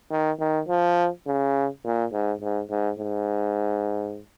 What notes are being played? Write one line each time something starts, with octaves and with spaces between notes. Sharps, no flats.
D#3
D#3
F3
C#3
A#2
G#2
G#2
G#2
G#2